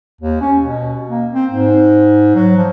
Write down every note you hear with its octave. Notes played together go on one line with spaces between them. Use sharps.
D#2
C#4
B2
A#3
C4
G#2
F#3
F3